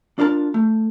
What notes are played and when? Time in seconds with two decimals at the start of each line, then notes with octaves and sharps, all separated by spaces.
0.19 D4 F4 A#4 A5
0.54 A3